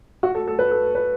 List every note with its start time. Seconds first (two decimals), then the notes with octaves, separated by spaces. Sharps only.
0.23 F#4
0.35 A4
0.47 A4
0.59 B4
0.71 A4
0.95 B4